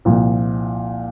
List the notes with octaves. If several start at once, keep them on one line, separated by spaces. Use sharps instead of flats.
C2 A#2 F3